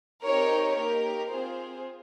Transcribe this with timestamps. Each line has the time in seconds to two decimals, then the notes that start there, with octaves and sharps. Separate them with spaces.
0.24 C4 D#4 G4 A#4 C#5
0.77 A#3 D#4 G4 A#4
1.30 C4 F4 G#4 C5